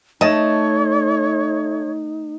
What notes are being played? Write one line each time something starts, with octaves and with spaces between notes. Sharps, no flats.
A3 D#4 C#5 D#5 A5